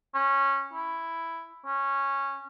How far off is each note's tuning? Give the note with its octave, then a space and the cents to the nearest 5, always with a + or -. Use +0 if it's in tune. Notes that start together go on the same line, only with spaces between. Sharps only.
C#4 -15
E4 +5
C#4 -10